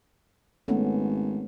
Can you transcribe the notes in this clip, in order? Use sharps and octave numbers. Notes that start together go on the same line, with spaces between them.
G#1 A3 B3 C#4